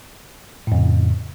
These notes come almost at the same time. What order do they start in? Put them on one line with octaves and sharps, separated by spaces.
A2 F2 C#3